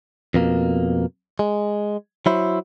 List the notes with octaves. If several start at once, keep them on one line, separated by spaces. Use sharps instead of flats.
F2 B2 A#3
G#3
F#3 E4 C5